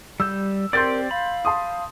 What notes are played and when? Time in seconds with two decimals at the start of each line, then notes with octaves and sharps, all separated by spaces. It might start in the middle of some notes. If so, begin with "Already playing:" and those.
0.20 G3 E6 G6
0.73 C4 G4 A#4 D5 C6 G6 A6
1.11 F5 B5
1.45 A5 C6 D#6